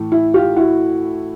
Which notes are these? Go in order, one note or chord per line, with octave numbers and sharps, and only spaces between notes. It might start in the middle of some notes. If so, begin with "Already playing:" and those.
Already playing: A2 E3 A3
E4
F4 G4
E4 F#4